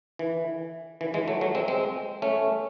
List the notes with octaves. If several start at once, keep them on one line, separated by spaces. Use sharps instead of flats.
E3
E3
E3 G#3
F#3 A3
F#3 A3
G#3 C4
G#3 C4
A3 C#4